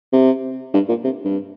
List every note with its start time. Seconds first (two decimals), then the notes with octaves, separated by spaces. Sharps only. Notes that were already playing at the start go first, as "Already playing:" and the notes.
0.12 C3
0.74 G2
0.89 A#2
1.04 C3
1.25 G2